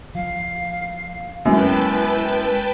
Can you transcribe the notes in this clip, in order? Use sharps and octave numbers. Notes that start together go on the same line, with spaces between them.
F3 F5
F#2 G#3 A#3 B3 E4 B4 G5 A5